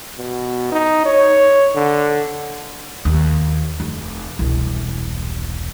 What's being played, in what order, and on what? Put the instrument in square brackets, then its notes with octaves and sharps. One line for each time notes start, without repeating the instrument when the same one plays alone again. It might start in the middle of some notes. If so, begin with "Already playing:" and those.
[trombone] B2
D#4
C#5
D3
[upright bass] D#2
F1
E1 C2